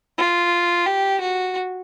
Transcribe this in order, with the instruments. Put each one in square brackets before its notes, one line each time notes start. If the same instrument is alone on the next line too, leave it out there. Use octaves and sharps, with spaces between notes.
[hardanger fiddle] F4
G4
F#4